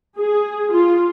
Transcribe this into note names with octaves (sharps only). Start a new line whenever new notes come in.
G#4
F4